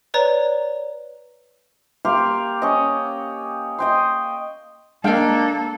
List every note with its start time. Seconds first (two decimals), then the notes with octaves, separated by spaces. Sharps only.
0.14 B4 C#5 D5 A#5
2.05 A#3 G4 F5 C6
2.62 C#4 D#5
3.78 D#5 G5 C6
5.04 G#3 A#3 D4 A4 A#4 F5 G5